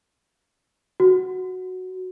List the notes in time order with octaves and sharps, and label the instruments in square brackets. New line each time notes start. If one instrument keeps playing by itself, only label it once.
[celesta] F#4